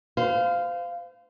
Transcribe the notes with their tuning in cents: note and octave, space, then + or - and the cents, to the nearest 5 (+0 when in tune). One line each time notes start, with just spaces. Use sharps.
C5 -35 F5 -5